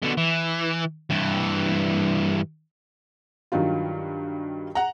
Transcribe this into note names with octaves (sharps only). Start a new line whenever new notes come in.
B2 D3
E3
G2 E3
G2 D#3 F#3 F4
F#5 A#5